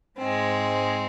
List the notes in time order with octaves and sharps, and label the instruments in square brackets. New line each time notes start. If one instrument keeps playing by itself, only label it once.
[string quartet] G#2 G#3 C4